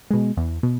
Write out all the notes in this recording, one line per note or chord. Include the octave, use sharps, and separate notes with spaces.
B2 G#3
E2
B2